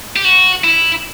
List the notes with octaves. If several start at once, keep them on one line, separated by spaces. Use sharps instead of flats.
G4
F#4
E4